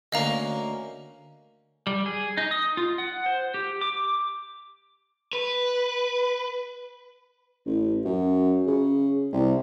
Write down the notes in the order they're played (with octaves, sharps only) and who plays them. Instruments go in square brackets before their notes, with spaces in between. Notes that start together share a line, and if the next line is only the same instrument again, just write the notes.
[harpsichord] D2 A#3 C#4 [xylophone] D#5 F5 A#5
[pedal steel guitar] G3
G#4
D#4
D#6
F4
F#5
C5
G4
D6
[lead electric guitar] B4
[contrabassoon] A1
F#2
C#3
C2